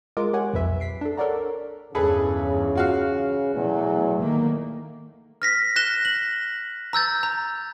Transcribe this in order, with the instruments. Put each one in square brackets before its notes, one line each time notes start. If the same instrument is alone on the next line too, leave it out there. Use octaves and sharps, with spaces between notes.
[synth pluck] G#3 F4 A#4 D6
G4 C#5 F#5 G#5
B1 F2 B4 E5
B6 C7 D7
D4 A4
A4 A#4 C#5 D5 F#5 A#5
[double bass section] E2 G2 [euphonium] C#3 [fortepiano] G#4 A4 B4
[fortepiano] F4 F#4 F5
[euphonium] E2 [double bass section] B2 F#3 A3
[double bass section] D#3 A3 A#3
[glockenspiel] F6 A#6 B6
F#6 A#6 E7 G7
F#7
A#5 E6 G6 A6
A#5